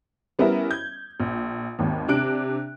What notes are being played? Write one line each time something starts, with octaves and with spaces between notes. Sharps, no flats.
G3 B3 C#4 E4 A#4 E5
G6 G#6
A#1
G#1 D#2
C3 D4 F#6 D7